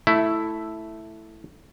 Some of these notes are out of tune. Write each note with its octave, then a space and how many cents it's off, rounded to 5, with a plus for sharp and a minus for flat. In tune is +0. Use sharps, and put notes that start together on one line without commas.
A3 +0 E4 +0